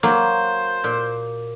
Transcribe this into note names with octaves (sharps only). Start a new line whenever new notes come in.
F#3 A#3 C5
A#2